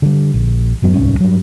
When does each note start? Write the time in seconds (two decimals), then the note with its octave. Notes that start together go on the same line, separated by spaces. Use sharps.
0.02 D3 G3
0.34 A#1
0.82 D#1 F#2 F#3 B3
0.94 D1 C2 G#2 C#4
1.20 G2 F#3